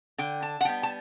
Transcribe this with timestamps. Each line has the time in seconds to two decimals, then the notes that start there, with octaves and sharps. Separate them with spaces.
0.18 D3 G5
0.43 A5
0.61 F#5
0.65 G3 B3 G5
0.83 A5